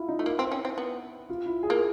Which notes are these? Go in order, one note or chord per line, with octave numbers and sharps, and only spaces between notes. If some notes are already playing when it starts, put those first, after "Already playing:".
Already playing: E4 F4
D#4
A3
A#3 E4
C4
C#4
C4
B3
F4
E4
G#4
A#3